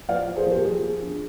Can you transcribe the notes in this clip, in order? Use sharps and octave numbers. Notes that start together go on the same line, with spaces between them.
F3 D5 F5
F3
G#4 C5
F3 G4 A#4
F3 G#4
F3
D4